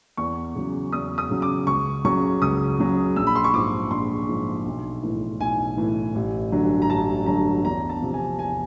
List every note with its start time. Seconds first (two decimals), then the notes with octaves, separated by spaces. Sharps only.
0.17 E2 C#6
0.55 C#3 F#3
0.92 E2 D#6
1.18 D#6
1.30 C#3 F#3
1.42 D6
1.67 C#2 C#6
2.05 C#3 F#3 C#6
2.42 C#2 D#6
2.79 C#3 F#3
3.16 A#1 E6
3.27 B5
3.35 C6
3.44 C#6
3.54 G#2 F3 D6
3.91 A#1 C6
4.29 G#2 F3
4.66 B1
5.03 A2 E3
5.40 B1 G#5
5.77 A2 E3
6.15 A1
6.52 G2 D3 F#3
6.82 A#5
6.90 A1 A5
7.26 G2 D3 F#3 A#5
7.64 E2 A#5
7.89 A5
8.02 C3 F3
8.14 G#5
8.39 E2 G#5